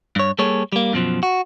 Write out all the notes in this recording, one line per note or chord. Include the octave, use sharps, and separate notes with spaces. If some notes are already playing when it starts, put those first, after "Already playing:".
G2 C#5
G3 A#3 G#4 A4 C#5
G3 A#3
F#2 B2 F3
F#4